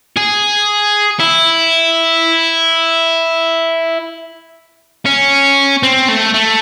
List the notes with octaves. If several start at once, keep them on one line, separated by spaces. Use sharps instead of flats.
G#4
E4
C#4
C4
A3
A3